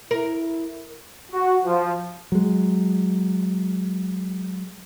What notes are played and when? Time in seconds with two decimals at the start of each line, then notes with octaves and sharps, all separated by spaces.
0.11 E4 A#4
1.32 F#4
1.65 F3
2.32 F#3 G#3